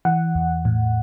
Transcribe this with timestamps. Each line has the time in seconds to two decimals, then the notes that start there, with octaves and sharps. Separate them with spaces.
0.05 E3 F#5
0.35 E2
0.65 A2